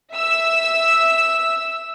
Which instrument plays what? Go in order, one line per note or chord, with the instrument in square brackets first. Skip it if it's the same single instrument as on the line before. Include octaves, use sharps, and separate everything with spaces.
[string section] E5 E6